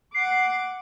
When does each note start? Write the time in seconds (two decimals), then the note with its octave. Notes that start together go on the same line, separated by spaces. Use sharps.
0.14 F#5 D6 C7